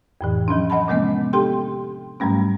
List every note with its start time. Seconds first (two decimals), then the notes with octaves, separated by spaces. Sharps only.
0.21 F2 A2 E3
0.48 F3 F#3 C#4 D4
0.70 D#5 F#5 A5 B5
0.88 C3 F3 G#3 A#3 B3 C#4
1.33 D4 G4 A4 G5 C6
2.20 G#2 F#3 G3 A3 C#4